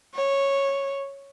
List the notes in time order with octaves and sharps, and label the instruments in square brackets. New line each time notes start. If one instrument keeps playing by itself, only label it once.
[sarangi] C#5